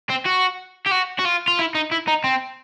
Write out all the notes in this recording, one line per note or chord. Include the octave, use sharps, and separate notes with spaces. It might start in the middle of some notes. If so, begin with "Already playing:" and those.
C4
F#4
G4
F#4
F#4
F4
F4
E4
D#4
E4
D#4
C4